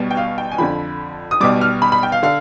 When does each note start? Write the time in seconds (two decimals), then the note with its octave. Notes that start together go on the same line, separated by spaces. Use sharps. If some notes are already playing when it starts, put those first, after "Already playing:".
Already playing: B1 B2 G3
0.11 G5
0.17 F5
0.38 G5
0.52 G#5
0.58 F2 D3 F3 B5
1.31 D#6
1.40 B1 B2 G3 D6
1.61 F6
1.82 B5
1.92 B5
2.03 G5
2.12 F5
2.23 D3 F5